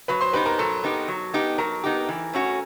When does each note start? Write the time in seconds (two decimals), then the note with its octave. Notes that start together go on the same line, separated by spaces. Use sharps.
0.08 F#3 B4 B5
0.21 C5 C6
0.33 B3 D#4 G4 B4 B5
0.46 A#4 A#5
0.58 F#3 A4 A5
0.84 B3 D#4 G4
1.08 F#3
1.34 B3 D#4 G4
1.58 F#3 A#4 A#5
1.84 B3 D#4 G4
2.09 E3
2.33 A3 C#4 F#4